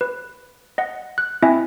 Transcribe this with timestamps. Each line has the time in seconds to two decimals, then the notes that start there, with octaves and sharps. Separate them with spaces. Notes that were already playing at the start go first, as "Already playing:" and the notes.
0.01 B4
0.78 D#5 F#5
1.18 F#6
1.42 C4 E4 D#5 E5 G#5